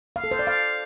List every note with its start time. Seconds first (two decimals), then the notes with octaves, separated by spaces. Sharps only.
0.16 F5
0.24 A4
0.31 C5
0.39 D5
0.47 F5